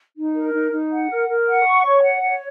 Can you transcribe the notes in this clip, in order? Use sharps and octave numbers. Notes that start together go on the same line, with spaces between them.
D#4
A#4
D#4
D#4
F#5
A#4
A#4
F#5
C#6
C#5
F#5
C#5